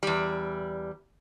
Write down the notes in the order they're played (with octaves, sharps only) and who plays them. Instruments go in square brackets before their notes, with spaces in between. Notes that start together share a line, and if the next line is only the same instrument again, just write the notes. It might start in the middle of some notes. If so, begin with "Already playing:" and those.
[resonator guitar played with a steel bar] E2 G3